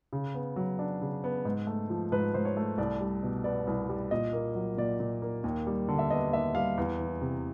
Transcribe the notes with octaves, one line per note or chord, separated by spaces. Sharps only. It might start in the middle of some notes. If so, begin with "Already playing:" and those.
C#3
B3
F#3
D4
C#3
B3
G#2
A3
F3
G#2 B4
G#2 C5
C#5
A3
C2 D5
G3
B2
B3 D5
C2
G3
A#2 D#5
A#3
F#3
A#2 D5
A#2
A#3
D#2
G3
D3
E5
B3 D#5
D#2 E5
G3 F5
E2
E3
C3